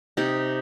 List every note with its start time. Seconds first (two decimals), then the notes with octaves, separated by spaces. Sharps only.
0.17 C3 D#4 G4